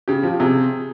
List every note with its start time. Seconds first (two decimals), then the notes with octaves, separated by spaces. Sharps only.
0.08 C#3 G4
0.23 F3
0.40 C3 G#4